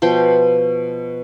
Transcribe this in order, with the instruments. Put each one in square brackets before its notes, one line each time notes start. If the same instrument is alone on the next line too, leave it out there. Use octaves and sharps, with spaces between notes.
[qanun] B2 F3 G5 C6